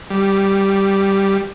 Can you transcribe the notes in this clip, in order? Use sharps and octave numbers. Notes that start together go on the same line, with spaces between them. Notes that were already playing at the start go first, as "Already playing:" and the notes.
G3